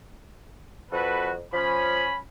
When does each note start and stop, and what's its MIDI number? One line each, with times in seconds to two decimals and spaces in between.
0.92 1.44 41
0.92 1.31 66
0.92 1.31 69
0.92 1.31 71
1.53 2.08 53
1.53 2.19 61
1.53 2.19 83